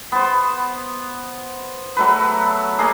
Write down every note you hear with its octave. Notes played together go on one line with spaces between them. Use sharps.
B3 C5
F#3 A3 B4
A3 A#3 G#4